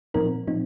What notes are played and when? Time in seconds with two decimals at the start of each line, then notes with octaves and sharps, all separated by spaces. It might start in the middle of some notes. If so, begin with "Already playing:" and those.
0.14 A#2 F3 C4 D#4 A#4
0.47 A#2 F3 C4 D#4